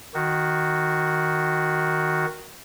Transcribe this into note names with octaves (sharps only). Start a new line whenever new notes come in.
D#3 F#4